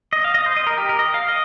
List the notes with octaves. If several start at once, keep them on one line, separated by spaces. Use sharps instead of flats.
D#5
F5
D#5
C5
D#5
A#4
G4
A#4
D#5
F5
D#5